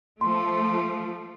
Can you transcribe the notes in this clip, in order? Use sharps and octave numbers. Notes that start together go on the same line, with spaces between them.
F3 A3 C6